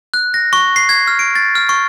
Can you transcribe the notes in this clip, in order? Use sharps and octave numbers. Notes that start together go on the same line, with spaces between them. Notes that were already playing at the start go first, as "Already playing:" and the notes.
F#6
A#6
C#6
C7
G#6
F6
D7
A6
F6
C#6